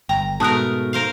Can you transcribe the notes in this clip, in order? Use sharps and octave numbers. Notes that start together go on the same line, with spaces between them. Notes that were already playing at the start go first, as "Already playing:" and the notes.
G1 G5 A#5
G#2 B2 A3 A#4 A5 D#6 F#6
A#4 C5 F5